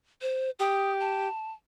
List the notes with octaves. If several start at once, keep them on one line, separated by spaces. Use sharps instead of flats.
C5
G4 D#6
A5